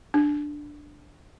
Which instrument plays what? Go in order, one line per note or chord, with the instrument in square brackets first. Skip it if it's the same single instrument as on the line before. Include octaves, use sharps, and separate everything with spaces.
[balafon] D4